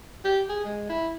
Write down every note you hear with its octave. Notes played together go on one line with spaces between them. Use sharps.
G4
G#4
G#3
E4